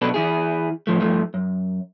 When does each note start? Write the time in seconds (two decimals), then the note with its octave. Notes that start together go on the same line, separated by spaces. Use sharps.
0.02 B1 B2 D4 A4 B4
0.14 E3 E4 G#4
0.87 A2 F3 A3
1.00 G2 F3 A3
1.34 F#2